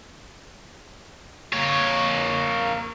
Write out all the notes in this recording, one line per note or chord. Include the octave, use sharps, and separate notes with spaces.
A#3 C#5